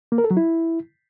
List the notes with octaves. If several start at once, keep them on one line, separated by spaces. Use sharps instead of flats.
A#3
A#4
A4
F#3
E4